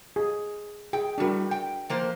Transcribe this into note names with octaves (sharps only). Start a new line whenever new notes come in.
G#4
G#4 G5
A2 G3 D4 F#4 A#4
G5
F3 A#3 C5